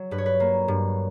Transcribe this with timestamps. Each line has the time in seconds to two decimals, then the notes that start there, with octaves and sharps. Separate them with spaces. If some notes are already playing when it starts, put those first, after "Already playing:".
Already playing: F#3
0.11 G2 B4
0.18 C#5
0.26 B4
0.40 A#3
0.68 G2